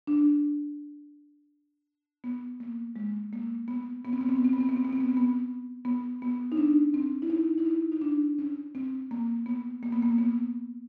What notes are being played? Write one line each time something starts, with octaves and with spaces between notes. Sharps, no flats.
D4
B3
A#3
G#3
A#3
B3
B3
C4
B3
C4
B3
C4
B3
C4
B3
C4
B3
C4
B3
C4
B3
B3
B3
D#4
D4
C4
E4
D#4
E4
D#4
D#4
D4
C#4
C4
A#3
B3
A#3
B3
A#3
B3